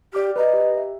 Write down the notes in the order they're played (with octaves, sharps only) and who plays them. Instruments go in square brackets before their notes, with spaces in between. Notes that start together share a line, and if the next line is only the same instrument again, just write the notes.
[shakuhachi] G4 [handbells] D5 D6 F6
[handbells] B4 A#5 [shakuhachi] D#5
[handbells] G4
E5